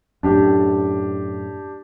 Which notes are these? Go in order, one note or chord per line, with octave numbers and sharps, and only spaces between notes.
F#2 A2 D4 G4